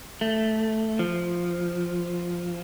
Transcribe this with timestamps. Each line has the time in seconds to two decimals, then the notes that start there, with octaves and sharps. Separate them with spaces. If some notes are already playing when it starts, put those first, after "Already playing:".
0.21 A3
0.99 F3